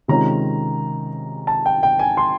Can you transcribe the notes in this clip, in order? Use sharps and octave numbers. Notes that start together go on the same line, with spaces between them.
C3 D#3 G#3 C#4 F4 A#5
A5
G5
G5
G#5
C6